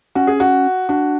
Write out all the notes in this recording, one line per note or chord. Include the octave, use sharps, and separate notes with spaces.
C#4 F#4
G#4
F#4
D4 F#4